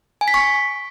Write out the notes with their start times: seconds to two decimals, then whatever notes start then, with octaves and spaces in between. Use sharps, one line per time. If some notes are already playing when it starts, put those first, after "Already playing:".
0.21 G#5
0.28 B6
0.34 C#6